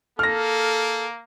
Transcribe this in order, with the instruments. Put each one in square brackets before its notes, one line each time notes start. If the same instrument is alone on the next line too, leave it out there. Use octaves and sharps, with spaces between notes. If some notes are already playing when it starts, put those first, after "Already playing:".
[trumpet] A#3 [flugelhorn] A4 [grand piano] F6 A#6